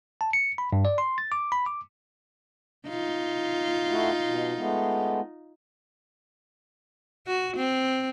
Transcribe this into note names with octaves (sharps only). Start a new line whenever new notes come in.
A5
C#7
B5
G2
D5
C6
A6
D6
B5
D6
D#4 F4
A3 E4 F#4
B2
G#3 A3 B3
F#4
C4